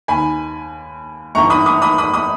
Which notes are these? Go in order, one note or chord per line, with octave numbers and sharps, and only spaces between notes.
D#2 D#3 G#5 B5
G1 G2 E3 A#5 C#6
B5 D#6
B5 D#6
B5 D#6
B5 D#6
B5 D#6